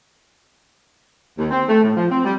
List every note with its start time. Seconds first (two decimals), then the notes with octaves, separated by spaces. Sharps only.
1.38 D#2
1.51 C4
1.69 A3
1.83 A2
1.96 F3
2.11 C4
2.25 G3